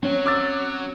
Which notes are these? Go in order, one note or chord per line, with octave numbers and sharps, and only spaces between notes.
F#3 C4 C#4 C#5
D6 E6 A6